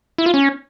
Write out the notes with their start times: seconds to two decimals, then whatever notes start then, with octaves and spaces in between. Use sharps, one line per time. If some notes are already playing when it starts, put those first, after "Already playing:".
0.18 E4
0.26 F4
0.34 C#4